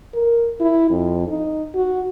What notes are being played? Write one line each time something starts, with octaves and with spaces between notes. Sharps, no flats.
A#4
E4
F2
D#4
F#4